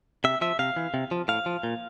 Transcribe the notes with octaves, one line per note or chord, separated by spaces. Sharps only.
C3 E5
F3 E5
C3 F5
E3
C3
F3
A2 F5
F3
A#2